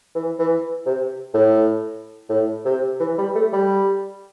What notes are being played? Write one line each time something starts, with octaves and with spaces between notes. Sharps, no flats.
E3
E3
C3
A2
A2
C3
E3
G3
A3
G3